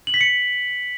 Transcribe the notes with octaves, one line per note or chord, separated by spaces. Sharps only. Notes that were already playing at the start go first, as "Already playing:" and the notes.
F#7
B6
C#7